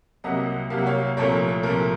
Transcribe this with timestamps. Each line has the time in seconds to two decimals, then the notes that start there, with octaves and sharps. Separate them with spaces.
0.24 C2 C3 F#3 A#3 D#5 F#5
0.70 C2 C3 F#3 A#3 F5
0.78 F#5
0.86 C#5 F5
1.17 C2 A#2 F3 A3 A#4 C#5
1.63 C2 A#2 F3 A3 A#4